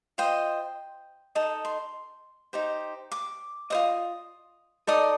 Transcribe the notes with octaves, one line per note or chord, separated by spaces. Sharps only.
F4 C5 D#5 G5
D#4 A4 D#5 A5
C6
D#4 G4 C5
D6
F4 C5 D#5 D#6
D#4 A4 D5 D#6